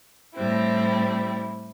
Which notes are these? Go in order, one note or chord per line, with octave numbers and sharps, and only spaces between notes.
A2 G3 C4 E4